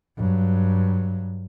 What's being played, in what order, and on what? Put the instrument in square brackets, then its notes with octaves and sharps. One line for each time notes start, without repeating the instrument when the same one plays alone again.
[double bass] G2 F#3